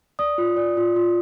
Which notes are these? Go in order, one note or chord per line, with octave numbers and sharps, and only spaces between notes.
D5 D#6
F4
D5
F4
F4